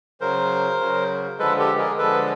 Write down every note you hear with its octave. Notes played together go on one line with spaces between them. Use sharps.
C#3 F#3 A#4 C5
C#3 F#3
D3 F3 G#3 A4 B4
G4 A4
G#4 A#4
D3 F3 G#3 A4 B4